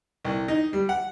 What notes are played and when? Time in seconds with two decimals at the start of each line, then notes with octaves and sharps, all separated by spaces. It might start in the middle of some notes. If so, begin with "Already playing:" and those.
0.25 C2
0.48 D#4
0.73 G3
0.89 F#5